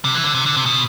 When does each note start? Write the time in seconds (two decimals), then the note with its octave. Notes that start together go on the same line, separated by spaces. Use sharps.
0.05 C3
0.15 E3
0.24 D3
0.35 C3
0.46 D3
0.57 C3
0.66 B2